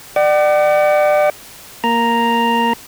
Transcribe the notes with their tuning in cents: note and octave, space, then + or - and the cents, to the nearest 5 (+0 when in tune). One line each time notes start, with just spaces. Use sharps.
D5 +30 F#5 +45
A#3 +0 A#5 +0